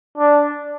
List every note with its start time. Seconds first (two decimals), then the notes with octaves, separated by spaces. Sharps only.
0.18 D4